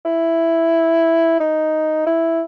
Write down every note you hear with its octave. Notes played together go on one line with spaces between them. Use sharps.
E4
D#4
E4